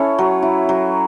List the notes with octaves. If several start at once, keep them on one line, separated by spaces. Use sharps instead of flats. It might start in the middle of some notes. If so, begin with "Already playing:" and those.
Already playing: C#4 E4 A4 C#5
F#3
E4
F#3